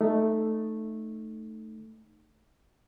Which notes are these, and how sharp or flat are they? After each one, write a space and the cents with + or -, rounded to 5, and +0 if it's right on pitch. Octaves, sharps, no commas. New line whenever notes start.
A3 +0 D#4 -15